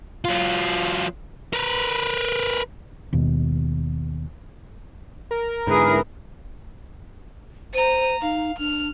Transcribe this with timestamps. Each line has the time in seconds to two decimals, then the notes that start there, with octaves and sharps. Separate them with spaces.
0.25 F#3 F4
1.53 A#4 B4
3.13 D#2 B2
5.31 A#4
5.67 G#2 D3 E4 G#4 B4
7.74 C5 A#5 D#7
8.22 D#4 F5
8.59 D4 F6